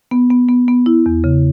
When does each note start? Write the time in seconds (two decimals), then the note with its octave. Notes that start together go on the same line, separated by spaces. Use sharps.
0.11 B3
0.30 B3
0.48 B3
0.68 B3
0.86 E4
1.06 E2
1.24 C#3